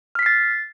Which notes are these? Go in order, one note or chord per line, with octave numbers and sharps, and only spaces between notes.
F6 A6 B6 C7